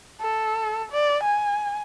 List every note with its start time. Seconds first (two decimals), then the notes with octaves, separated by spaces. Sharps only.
0.21 A4
0.91 D5
1.23 G#5